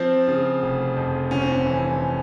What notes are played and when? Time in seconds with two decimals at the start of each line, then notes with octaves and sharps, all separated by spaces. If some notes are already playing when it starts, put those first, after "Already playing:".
Already playing: F3 C4
0.28 C#3
0.62 F1
0.96 F2
1.30 G1 C#4
1.42 C4
1.52 C#4
1.66 E3